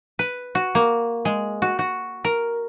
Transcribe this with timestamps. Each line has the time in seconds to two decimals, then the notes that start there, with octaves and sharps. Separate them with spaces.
0.19 B4
0.55 F#4
0.75 A#3
1.25 G#3
1.62 F#4
1.79 F#4
2.24 A#4